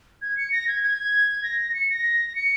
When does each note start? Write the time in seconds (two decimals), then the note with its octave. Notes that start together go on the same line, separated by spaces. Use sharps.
0.22 G#6
0.37 C#7
0.52 A#6
0.68 G#6
0.83 G#6
1.43 A#6
1.74 C#7
1.90 A#6
2.35 C#7